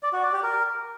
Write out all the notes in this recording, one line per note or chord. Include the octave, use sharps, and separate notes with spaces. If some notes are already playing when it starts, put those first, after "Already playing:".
D5
F#4
D5
G4
A#4